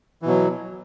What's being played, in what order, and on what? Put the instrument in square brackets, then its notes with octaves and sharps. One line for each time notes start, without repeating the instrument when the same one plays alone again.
[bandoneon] E3
B2
F#3